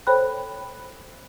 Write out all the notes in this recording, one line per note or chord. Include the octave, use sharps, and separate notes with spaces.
A4 C5 C#5 G5 B5 F#6